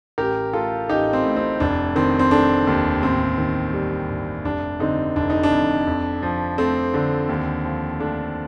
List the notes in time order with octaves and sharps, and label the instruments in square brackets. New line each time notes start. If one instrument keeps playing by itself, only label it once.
[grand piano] A1 G4 A#4
A3 F4 A4
A1 D#4 G4
C4
A2
C4
F1 D4
D#3 C4
C4
A3 D4
D#2
A1 C4
D#3
G3
G2
F1 D4
D3 C4 D#4
F1 D4
D#4
D4
F2
F2
F3
A3 C4
D3
D#2
F3
A3 D4